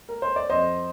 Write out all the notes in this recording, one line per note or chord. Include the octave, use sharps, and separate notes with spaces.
A#4
C5
D5
F2 C5 D#5